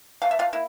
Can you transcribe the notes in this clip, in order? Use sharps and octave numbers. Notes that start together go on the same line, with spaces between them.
E3 A3 F5
E5
F4 F5
A#3 E4